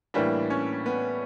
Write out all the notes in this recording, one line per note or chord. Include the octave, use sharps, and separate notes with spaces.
A2 E3 G3 A#3 D4
C#4
B3